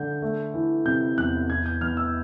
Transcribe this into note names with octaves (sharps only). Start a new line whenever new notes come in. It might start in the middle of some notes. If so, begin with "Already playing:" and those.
Already playing: D3 G6
A3
E3
C3 G6
E2 F#6
E2 G#6
G6
E2 F6
E6